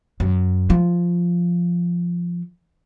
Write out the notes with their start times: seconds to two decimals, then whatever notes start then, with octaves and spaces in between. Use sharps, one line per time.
0.20 F#2
0.70 F3